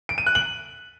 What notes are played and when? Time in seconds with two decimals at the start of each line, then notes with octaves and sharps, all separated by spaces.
0.09 D7
0.18 D#7
0.26 F#6
0.35 F#7